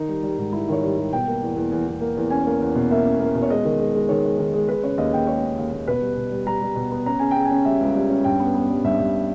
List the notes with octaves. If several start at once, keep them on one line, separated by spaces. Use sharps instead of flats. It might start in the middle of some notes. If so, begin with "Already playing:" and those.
Already playing: D#3 D#4
G3
G3
G#2
G3 E4
D#3 C#5
G3
G3
B2 G5
A#3
E2
E2
E2
E2
A#3
E2
C#4 G#5
A#3
E2
B2
A#3 E5
C#4
A#3
B2
C#5
G#3 D#5
D#3
G#3
G#3
D#3 C#5
G#3
D#3
G#3
G#3 B4
C#3 C#5
D#2 D#5
D#2 G5
G#3 C#5
C#4
D#2
D#2
B2 B4
G3
B2
G3
G3 A#5
G3
B2
B3
C#4 A#5
C#3 G#5
C#3 G5
G#5
C#4
G3 E5
C#2
G3
C#4
G2 G5
B3
B3
G3
G2 E5
G2